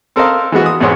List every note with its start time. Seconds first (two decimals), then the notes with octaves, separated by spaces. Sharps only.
0.16 C4 A4 A#4 C5 D#5 F5
0.52 E3 G#3 B3 F#4
0.66 D#6
0.80 B1 E2 G#2 B3 C5 C#5